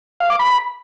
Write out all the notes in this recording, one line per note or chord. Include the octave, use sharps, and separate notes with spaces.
F5
D6
B5